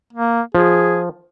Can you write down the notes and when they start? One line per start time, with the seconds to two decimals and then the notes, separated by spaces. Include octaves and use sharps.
0.13 A#3
0.55 F3 G#4